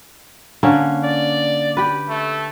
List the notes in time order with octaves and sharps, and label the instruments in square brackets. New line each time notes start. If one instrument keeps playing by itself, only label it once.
[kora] D3 A#3 C#4
[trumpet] D5
[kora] G4 B4
[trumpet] A3